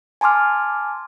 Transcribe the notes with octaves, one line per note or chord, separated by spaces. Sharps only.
G#5 A5 C6 D6 F6